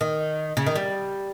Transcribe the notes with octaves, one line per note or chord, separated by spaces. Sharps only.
D#3
C#3
D#3
G3